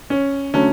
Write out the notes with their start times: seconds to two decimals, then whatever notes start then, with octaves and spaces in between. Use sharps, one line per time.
0.10 C#4
0.54 D3 F#3 A3 C#4